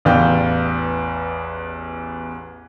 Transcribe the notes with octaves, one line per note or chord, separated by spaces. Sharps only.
A1 E2 D5 F5 G5 G6